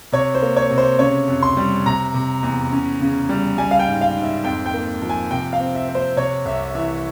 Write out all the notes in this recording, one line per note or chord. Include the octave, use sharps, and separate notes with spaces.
C3 C#5
C5
A#3
C#5
C3
C5
C#3 C#5
F2
C6
G3
C3 A#5
C3
E2
C#4
C#3
G3
G3 G#5
F5
G5
G#2
F5
G#2
E5
F2 G5
G5
A#3
F3
G#5
C3 G5
F5
C4
E5
C4
C5
C3 C#5
C2 E5
E3 E5